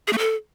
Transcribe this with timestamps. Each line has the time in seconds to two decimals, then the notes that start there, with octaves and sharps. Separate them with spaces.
0.07 G#4
0.13 A3
0.18 A4